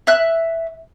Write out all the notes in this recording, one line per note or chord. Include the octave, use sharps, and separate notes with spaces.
E5 F#6